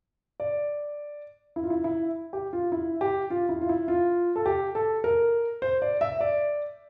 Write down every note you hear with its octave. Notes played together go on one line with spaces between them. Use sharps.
D5
E4
F4
E4
E4
G4
F4
E4
G4
F4
E4
F4
E4
F4
A4
G4
A4
A#4
C5
D5
E5
D5